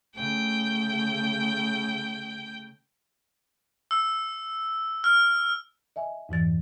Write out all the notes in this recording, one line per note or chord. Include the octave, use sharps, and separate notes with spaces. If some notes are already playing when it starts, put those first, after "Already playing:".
C#3 A3 G5
E6
F6
D#5 E5 G#5
F2 G#2 E3 A6